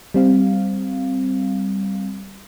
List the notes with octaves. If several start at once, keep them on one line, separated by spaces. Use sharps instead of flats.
G3 C4 F5